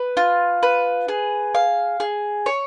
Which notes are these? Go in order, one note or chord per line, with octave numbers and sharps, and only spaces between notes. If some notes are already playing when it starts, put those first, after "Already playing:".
Already playing: B4
F4
B4
G#4
F5
G#4
C#5